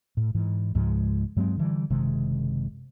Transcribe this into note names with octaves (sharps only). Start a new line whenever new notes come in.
A2
G#2 E3
C#2 G#2 F3 G#3
G2 F#3 G#3 C4
D3 E3 G3
F#1 C3 D#3 G#3